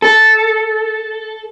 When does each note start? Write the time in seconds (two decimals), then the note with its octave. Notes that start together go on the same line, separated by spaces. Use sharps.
0.02 A4